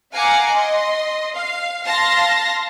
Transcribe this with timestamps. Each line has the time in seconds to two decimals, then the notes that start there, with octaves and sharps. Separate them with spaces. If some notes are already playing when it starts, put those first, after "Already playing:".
0.14 F5 F#5 G#5 A#5 D6
0.52 D#5 C6
1.35 F5
1.85 F5 A5 C6 A#6